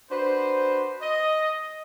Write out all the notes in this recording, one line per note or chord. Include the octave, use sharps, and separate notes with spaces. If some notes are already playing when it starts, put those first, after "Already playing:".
D4 F#4 B4 C5
D#5